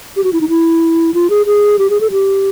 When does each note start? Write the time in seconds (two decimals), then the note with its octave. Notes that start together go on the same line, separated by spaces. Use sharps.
0.17 G4
0.24 F#4
0.33 E4
0.41 D#4
0.49 E4
1.14 F4
1.30 G#4
1.46 G#4
1.79 G4
1.90 G#4
2.01 A4
2.11 G4